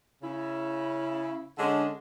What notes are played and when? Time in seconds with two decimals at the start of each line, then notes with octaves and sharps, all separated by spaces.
0.22 C#3 E4
1.58 D3 G#3 C#4 D4 G#4